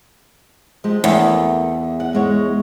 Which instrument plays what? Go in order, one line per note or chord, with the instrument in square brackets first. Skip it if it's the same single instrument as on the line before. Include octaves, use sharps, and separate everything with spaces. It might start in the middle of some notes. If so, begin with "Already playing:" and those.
[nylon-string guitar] F3 G#3 G4
[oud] E2 [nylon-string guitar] A3 G4 A#4
[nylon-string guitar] F#5
G#2 G#3 C#5